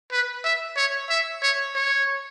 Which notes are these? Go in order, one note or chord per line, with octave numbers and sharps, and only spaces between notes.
B4
E5
C#5
E5
C#5
C#5